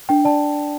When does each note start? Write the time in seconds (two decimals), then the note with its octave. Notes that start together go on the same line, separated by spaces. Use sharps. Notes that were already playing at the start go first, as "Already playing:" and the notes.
0.09 D4 G5
0.25 D5 A5